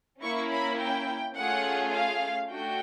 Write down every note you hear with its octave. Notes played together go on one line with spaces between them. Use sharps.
A#3 C#4 E4 C#6
B5
G5
A3 C#4 F4 G#4 F#5
F5
A3 D4 F#4 G5